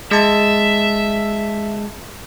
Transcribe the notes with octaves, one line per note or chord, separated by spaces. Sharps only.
G#3 E5 A5